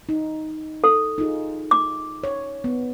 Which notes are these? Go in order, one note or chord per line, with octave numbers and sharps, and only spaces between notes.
D#4
A4
D#4 F4 G#4
D6
C#5
B3